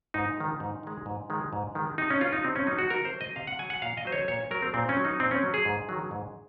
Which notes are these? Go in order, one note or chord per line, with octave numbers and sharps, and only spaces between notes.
G#2 D#4
D#3 G#3
G#2
D#3 G#3
G#2
D#3 G#3
G#2
D#3 G#3
C3 D#4
C#4
F#3 F4
D#4
C3 C4
C#4
F#3 D#4
F#4
C3 A#4
C5
F#3
D#5
C3 F5
F#5
F#3 G#5
F#5
A#2 F5
D#5
F#3 C5
C#5
A#2 C#5
F#3 A#4
C4
A#2 C4
C#4
F#3
D#4
A#2 C4
C#4
F#3
G#4
G#2
D#3 F#3
G#2